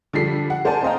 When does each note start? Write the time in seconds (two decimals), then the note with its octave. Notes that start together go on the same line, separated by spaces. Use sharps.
0.13 D3 F3 G3 A4 B6 C7
0.50 F#5
0.65 A#4 C5 D5 F#5 G#5 A5
0.83 C4 C5 D#5 F5 G5 A#5